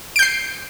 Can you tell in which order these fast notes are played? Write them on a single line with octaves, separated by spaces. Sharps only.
D7 G6 C7